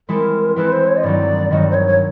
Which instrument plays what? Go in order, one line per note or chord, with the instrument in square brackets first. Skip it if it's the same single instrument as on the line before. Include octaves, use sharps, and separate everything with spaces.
[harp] E3 G#3 C4 E4 A4 [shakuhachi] A#4
[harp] E3 G#3 C4 E4 A4 [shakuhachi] B4
[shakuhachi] C5
C#5
D#5
[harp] G2 D#3 F#3 [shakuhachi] D5
[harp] G2 D#3 F#3 [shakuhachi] D#5
[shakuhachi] D5
C5
C#5
C#5